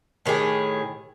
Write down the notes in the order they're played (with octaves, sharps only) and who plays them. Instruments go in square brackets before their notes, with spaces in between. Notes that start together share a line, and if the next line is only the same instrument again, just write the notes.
[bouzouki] A2 D#3 G4 G#4